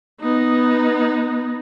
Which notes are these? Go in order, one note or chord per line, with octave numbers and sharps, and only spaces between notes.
B3 D#4